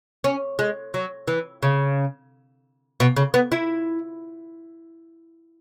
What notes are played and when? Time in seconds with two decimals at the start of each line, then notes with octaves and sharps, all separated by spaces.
0.24 C#4
0.59 G#3
0.94 F#3
1.28 E3
1.63 C#3
3.00 B2
3.16 C#3
3.34 B3
3.52 E4